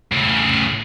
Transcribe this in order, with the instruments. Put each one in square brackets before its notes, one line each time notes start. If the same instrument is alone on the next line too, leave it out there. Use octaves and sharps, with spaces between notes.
[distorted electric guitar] A2 C#3